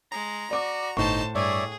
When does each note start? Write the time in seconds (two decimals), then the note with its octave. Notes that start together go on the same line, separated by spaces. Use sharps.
0.12 G#3 A#5
0.51 F#4 D5 D6
0.97 G1 A2 D#4 C5 A5 C#6
1.35 G2 G#4 C#5 D5 E5